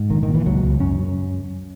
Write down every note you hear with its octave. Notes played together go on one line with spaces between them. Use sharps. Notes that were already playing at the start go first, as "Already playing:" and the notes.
Already playing: G#2
A#1 D#3
D#3
A#2
E3
C#2 F#3
C#2
F#2 C#4
F#2